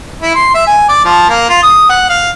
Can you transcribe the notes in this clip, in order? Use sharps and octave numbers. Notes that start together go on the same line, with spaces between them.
E4
C6
E5
G#5
D5
F3
A#3
F4
D#6
F#5
F5